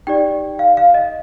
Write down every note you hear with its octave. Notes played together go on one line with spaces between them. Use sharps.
D#4 G4 D5 G5
F5
F5
D#5